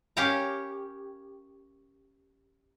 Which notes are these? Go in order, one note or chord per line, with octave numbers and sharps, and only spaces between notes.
C#4 G4 A#4 F5 G5 A#5